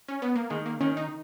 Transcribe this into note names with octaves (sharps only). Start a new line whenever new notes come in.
C#4
B3
A#3
D#3 G#3
A#3
D#3 C#4
D#4